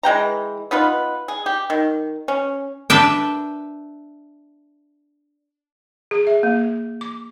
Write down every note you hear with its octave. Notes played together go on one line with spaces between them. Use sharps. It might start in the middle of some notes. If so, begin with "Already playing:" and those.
E3 G#3 G5 A#5
B3 D#4 F4 B4
G#4
G4
D#3
C#4
D4 B4 E5 G5
G#4
E5
A#3
D6